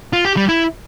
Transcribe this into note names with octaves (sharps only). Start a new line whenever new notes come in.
F4
G4
G3
E4